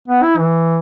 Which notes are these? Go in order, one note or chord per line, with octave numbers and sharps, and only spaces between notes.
B3
E4
E3